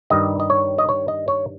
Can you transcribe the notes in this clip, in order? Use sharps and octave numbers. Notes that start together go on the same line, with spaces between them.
G2 D#3 G3 D#5
D#5
C#5
D#5
C#5
D#5
C#5